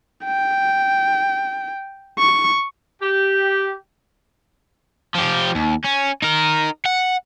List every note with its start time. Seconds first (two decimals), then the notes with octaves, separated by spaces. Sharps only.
0.25 G5
2.19 C#6
3.02 G4
5.15 F3 G4
5.55 D#2
5.85 C#4
6.22 D#4 A#4
6.86 F#5